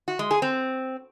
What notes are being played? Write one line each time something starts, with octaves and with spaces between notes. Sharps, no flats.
F#4
G#3
G#4
C4